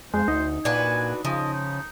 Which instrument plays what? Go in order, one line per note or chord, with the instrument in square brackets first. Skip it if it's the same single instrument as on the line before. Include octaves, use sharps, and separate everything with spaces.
[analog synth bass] F2 [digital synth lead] G#3 [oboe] C5
[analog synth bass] D2 [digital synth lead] D#4
[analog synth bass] A#2 [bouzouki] D4 F#4 B4 [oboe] G#5
[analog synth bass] C#3 [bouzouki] F3 [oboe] D#5
[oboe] D#4